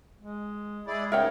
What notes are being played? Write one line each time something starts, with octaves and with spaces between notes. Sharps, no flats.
G#3
G#3 E4 G#4 D5
G#2 C#3 A#4 C#5 E5 G5